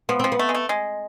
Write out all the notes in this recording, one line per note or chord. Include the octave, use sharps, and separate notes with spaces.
F3 B3
F3 C4
B3
A3
G#3
A3
G#3